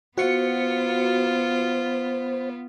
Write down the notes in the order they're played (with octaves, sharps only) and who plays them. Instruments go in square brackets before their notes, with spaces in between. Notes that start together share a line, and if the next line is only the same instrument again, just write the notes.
[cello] B3 [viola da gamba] F4 [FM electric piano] F#4 C#7 [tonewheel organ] C5